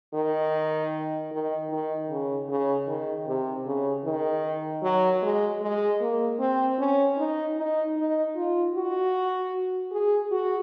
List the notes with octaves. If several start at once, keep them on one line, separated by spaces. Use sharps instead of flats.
D#3
D#3
D#3
C#3
C#3
D#3
C3
C#3
D#3
F#3
G#3
G#3
A#3
C4
C#4
D#4
D#4
D#4
F4
F#4
G#4
F#4